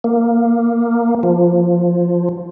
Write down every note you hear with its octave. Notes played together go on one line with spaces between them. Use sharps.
A#3
F3